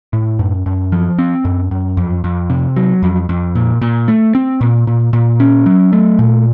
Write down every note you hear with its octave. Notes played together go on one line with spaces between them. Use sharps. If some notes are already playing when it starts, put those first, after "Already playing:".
A2
F#2
F#2
F3
C4
F#2
F#2
F2
F2
C3
F#3
F2
F2
A#2
A#2
A3
C4
A#2
A#2
A#2
C#4
F#3
A3
A#2